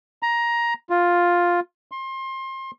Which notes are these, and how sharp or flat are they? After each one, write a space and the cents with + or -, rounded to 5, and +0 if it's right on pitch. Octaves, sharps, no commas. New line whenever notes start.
A#5 +15
F4 +5
C6 +30